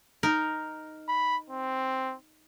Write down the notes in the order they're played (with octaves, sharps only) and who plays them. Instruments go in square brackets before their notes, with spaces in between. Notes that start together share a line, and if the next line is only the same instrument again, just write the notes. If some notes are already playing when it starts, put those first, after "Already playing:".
[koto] D#4 A#4
[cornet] B5
C4